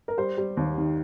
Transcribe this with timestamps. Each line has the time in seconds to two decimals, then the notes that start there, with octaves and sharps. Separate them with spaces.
0.08 A#4
0.18 G3 C5
0.37 G3
0.57 D#2
0.78 D#3